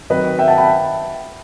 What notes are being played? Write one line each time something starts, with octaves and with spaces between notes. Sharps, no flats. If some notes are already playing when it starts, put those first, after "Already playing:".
D#3 F#3 C4 B4 D#5
E5 G5
F#5 A5
G5 B5